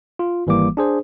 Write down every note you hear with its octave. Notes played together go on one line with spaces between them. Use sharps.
F4
G#1 E3 G3 A#3 D6
D4 G#4 C5